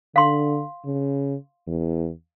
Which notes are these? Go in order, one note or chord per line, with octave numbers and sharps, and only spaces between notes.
D3 F5 C6
C#3
E2